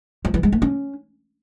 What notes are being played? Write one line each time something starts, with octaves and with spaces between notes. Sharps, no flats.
F3
E3
G#3
A3
C#4